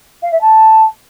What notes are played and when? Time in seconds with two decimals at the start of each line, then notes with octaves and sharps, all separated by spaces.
0.22 F5
0.32 E5
0.41 A5